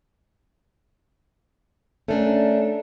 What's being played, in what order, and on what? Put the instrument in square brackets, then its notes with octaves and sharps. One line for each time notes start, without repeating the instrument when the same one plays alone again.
[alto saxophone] A3 [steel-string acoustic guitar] C#4 D4 A#4